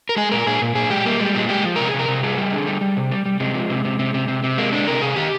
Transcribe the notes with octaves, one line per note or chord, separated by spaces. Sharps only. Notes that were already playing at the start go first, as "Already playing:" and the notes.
A#4
G#3 G#4
A#2 A#4
A#2 G#4
A#2
A#2 G#4
G#3 G4
G3 A#3
G3 G#3
A#2 G#3
G#3 G4
F3
C3 A#4
G#4
C3
A#4
C3
G3 G#4
G3
D3
G3
G3
C3
G3
G3
C3 G#3
F3
C3
C3
C3
C3
C3
C3
G#3 A#3
D3 D4
C3 A#4
C3 G#4
D#3 G4